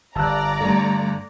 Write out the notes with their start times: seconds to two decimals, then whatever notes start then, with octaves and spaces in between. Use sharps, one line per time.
0.15 G1 D5 A5 A#5 E6 F#6
0.61 G2 D3 G3 A3 A4